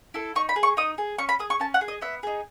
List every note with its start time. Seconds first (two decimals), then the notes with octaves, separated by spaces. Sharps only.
0.14 E4 A4
0.36 D#4 C#6
0.49 B5
0.56 G#4
0.63 C#6
0.77 D#4 D#6
0.98 G#4
1.18 C#4 C#6
1.29 B5
1.39 G#4 D#6
1.50 C#6
1.60 C#4 A5
1.74 F#5
1.81 G#4
1.88 D#5
2.01 B3 E5
2.23 D#4 G#4